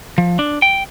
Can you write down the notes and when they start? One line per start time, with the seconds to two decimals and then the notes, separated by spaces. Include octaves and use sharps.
0.18 F3
0.39 D4
0.62 G5